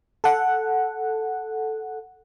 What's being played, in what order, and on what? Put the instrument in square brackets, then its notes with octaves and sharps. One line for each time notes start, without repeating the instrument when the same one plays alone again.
[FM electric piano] A4 F#5